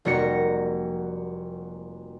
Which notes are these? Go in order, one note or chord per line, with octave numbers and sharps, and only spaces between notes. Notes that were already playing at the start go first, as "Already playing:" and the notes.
F1 G3 A#3 F#4 A#6 C#7